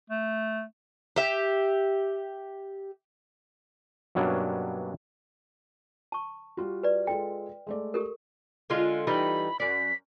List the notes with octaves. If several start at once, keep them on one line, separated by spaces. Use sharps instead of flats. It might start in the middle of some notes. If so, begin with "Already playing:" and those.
A3
G4 E5
G2 B2 F#3 A#3 C#4 D4
A5 C#6
G3 F4 F#4
B4 D5
G#3 F4 A4 G5
G#3 A3 D5
G4 A4 A#4
D3 G#3 F4
E3 G3 D#4 B5
F#2 D5 B6